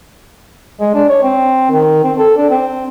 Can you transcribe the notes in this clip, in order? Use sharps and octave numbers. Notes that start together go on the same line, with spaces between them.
G#3
D4
C#5
C4
D#3
C4
A4
D4
C4